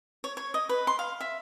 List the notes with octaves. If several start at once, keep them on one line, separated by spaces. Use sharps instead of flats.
C#5
C#5
D#5
B4
C6
F5
E5